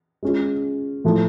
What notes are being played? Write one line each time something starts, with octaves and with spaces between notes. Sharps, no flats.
G#3 C#4 F4
A2 F3 A3